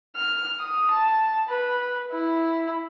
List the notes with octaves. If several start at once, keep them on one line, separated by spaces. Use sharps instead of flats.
F6
D#6
A5
B4
E4